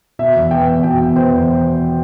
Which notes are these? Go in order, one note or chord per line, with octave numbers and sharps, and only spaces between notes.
B2 E5
E2
B3 G5
E2
B2 G5
E2
B3 C5
E2